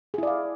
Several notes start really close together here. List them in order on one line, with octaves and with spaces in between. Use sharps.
G#4 E4 D5 F5